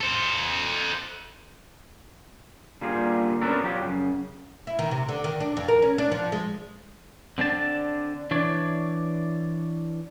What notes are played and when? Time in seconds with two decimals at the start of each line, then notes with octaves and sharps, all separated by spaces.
0.01 A4 C5
2.81 D3 G3 A#3 F4 G4 G#4
3.41 B3 C#4 D4 F#4 A4 A#4
3.64 F3 F#3 G4
3.82 F#2 C#3
4.67 E4
4.79 D#3
4.91 C3
5.08 D3
5.24 D#3
5.40 D4
5.57 F2
5.68 A#4
5.82 C#4
5.98 D4
6.12 F3
6.32 G#3
7.38 D3 C4 D4 A5
8.31 E3 D4 C#5 D5